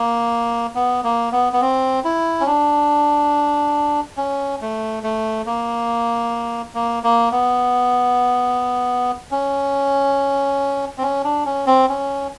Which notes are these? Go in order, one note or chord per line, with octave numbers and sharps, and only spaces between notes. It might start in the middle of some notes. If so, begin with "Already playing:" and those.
Already playing: A#3
B3
A#3
B3
B3
C4
E4
C#4
D4
C#4
A3
A3
A#3
A#3
A#3
B3
C#4
C4
C#4
D4
C#4
C4
C#4